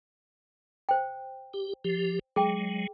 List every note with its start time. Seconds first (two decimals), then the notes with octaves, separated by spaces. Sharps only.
0.89 C5 G5
1.54 G4
1.84 F3 G4
2.36 F#3 G#3 G#4 G5